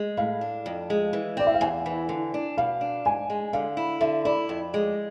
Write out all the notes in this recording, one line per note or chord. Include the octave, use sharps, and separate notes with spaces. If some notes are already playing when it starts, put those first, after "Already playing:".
Already playing: G#3
A2 F5
D4
F2
G#3
E3
C4 D5
E5
F5
E2 G#5
E3
D3
D4
B2 F5
D4
G#2 G#5
G#3
D3 F5
E4
D3 E5
E4 D5
F2
G#3